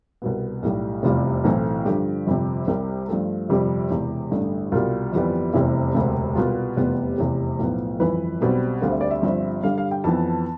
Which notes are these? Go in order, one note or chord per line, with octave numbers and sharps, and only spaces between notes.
C2 B2 B3
B1 A2 G3
F1 E2 C3 G3 F4
B1 A2 E3 A3 C4
G2 D3 F3 G4
G1 F2 C3
C2 C3 G3
G2 F3 A3
G1 F2 C3 G3 G4
E1 E2 C3
A1 G2 D3 A3
C2 B2 G3 F4
G1 F2 E3 G3 B3
F1 E2 C3 G3 C4 E4
E1 D2 C3
C2 B2 G3 B3 F4
F1 E2 C3 G3 B3
F1 E2 C3 G4
B1 A2 F3 B3
G1 F2 E3 B4
B1 B2 G3 C4
D2 D3 G3 C4 F5
E5
D5
E5
G1 G2 F3 C4
G2 D3 G3 F5
F5
G5
F2 E3 B3 A5